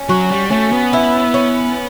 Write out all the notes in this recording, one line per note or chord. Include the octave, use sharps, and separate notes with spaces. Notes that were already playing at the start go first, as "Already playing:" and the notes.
Already playing: C#4
F#3 F#4
G3
A3 C#4
B3
E4
C#4